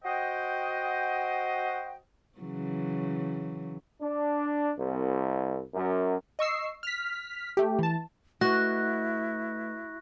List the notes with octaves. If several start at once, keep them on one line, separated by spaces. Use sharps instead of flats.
F#4 C5 D#5 G5
C#3 E3 F#3
D4
C2
F#2
D#5 C#6 E6 C7
F6 B6
A3 G4
E3 A5
A3 E4 F#4 B4 C#6 F#6 A#6